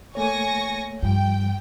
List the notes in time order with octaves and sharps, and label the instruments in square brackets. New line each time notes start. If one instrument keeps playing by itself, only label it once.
[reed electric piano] A3 A#3 C#5 [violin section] G#5 C#6 A#6
[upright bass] G2 [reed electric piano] F3 G3 [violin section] G5